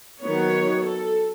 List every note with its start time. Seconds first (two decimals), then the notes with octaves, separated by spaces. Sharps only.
0.21 D#3 F#3 B3 C#5
0.84 A4